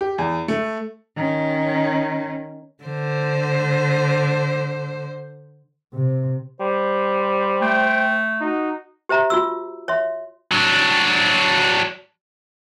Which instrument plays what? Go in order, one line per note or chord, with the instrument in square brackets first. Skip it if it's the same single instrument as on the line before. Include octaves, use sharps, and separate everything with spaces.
[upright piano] G4
E2
A3
[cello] D#3 C#4
D3 C5
[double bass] C3
[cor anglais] G3 [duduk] C5
[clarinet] A3 [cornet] G5
[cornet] D#4 [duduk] F#4
[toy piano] G4 C5 E5 A#5
F4 F#4 E6
C#5 E5 C6
[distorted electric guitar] F#3 D4